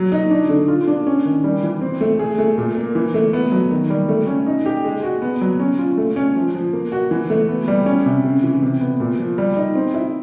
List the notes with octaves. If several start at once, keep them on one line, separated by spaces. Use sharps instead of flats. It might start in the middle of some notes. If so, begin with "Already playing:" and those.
Already playing: F#3
D#4
D4
D3
F4
D4
C#4
D#3
G3
E3
C4
A3
G#4
A3
A#2
A#3
E3
A3
B3
F#3
D#3
G3
A3
C#4
D#4
G4
G#3
F#4
B3
F#3
C#4
F4
A3
C#4
F3
F3
A#3
F#4
E3
A3
B3
G3
C#4
C3
C#3
E3
C3
B3
A#2
F3
G3
D#4
C4
E4